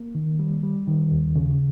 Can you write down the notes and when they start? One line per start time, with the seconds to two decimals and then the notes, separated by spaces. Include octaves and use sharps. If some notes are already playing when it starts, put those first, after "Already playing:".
Already playing: A#3
0.15 D#3
0.39 G3
0.63 G3
0.87 D#3
1.12 D#2
1.35 C#3